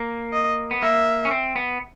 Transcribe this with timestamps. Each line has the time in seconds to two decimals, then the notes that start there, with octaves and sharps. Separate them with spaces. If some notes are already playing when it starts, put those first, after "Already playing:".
Already playing: A#3
0.33 D#5
0.71 B3
0.82 A#3 E5
1.25 C#4
1.31 C4
1.56 B3